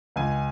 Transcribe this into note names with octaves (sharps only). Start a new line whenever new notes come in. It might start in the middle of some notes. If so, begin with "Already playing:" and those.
C#2 G#5